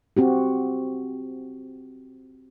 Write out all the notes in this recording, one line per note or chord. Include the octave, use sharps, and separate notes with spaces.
C4 F#4 G4